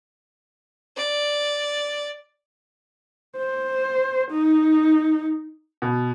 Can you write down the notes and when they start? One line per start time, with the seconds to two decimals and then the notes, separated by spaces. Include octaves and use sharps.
0.97 D5
3.37 C5
4.31 D#4
5.82 B2